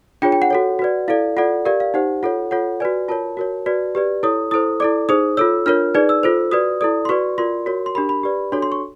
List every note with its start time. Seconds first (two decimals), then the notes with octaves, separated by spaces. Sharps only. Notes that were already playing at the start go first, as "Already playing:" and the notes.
0.22 D4 F4 G#4 C#5 G5
0.32 G5
0.42 F#5
0.50 F#4 A4 C#5
0.79 F#4 B4 D5
1.08 E4 A4 D5 F5
1.37 F4 A4 D5 F#5
1.65 G4 A#4 D5 F5
1.80 F5
1.94 D#4 G4 C5 F#5
2.23 F4 A4 C#5 F#5
2.51 F4 A4 C#5 F#5
2.80 F#4 B4 D5 G#5
3.08 F4 A#4 C#5 A5
3.37 F#4 A#4 C#5
3.66 F#4 B4 D5
3.95 G4 B4 D5
4.23 E4 A4 C#5 D#6
4.51 E4 A4 C5 D#6
4.80 E4 A4 D5 D6
5.09 D#4 G#4 C5 D#6
5.37 F4 A4 C#5 E6
5.66 D4 F4 A#4 C#5 F6
5.95 D#4 G#4 B4 D5
6.09 E6
6.23 F4 A4 C5
6.51 F#4 B4 D5 D#6
6.81 E4 A4 D5 D#6
7.05 C6
7.09 F#4 B4 D5 C#6
7.38 F4 A#4 D5 C6
7.66 F#4 A#4 C#5
7.86 C6
7.95 D4 G4 A#4 B5
8.09 B5
8.23 G4 B4 D5
8.52 D4 F#4 A4 C#5 C6
8.62 C6
8.72 C#6